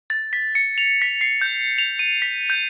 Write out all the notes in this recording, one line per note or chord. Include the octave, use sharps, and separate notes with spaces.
A6
B6
C#7
F7
B6
C7
G6
F7
D#7
B6
G6